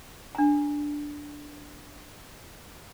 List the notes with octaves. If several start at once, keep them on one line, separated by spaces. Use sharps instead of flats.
D4 A#5